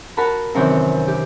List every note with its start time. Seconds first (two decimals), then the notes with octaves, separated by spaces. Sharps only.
0.17 F#4 A#4 A5 B5
0.54 F#2 C3 D#3 E3 C4
1.08 G4